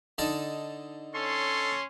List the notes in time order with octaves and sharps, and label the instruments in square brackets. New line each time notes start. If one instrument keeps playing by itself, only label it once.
[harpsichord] D3 D#4 A5
[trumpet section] C#4 C#5 C6 [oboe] A4